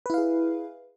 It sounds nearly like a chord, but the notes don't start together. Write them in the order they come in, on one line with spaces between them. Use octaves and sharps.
B4 E4 F5 G#4